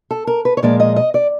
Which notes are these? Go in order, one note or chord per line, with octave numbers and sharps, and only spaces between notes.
A4
A#4
B4
C#5
A#2 F3 G#3 D5
D#5
D#5
D5